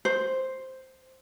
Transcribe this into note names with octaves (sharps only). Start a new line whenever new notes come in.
C5